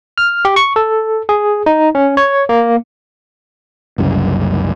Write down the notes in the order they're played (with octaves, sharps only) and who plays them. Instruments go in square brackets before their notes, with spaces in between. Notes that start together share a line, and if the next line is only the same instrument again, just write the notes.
[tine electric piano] F6
G4
C#6
A4
G#4
D#4
C#4
C#5
A#3
[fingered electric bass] F#1 C2 F#2